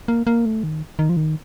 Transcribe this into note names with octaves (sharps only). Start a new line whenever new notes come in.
A#3
A#3
A3
D#3
D#3
F3
D#3